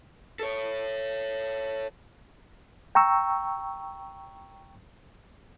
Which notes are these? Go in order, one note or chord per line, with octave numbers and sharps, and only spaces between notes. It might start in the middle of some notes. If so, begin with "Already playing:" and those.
A4 C#5
G5 A#5 C#6 E6